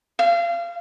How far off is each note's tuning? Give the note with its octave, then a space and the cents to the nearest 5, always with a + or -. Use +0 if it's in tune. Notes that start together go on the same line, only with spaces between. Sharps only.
F5 -30